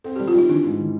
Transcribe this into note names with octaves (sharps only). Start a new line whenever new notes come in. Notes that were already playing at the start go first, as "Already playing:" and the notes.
C4 A4
G4
G3
F4
G3 D#4
E3 D4
G#2
E3